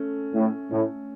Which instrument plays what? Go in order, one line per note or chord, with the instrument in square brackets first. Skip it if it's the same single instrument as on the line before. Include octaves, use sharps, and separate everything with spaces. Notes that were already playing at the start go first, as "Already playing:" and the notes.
Already playing: [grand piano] A3 C#4
[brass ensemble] A2
A2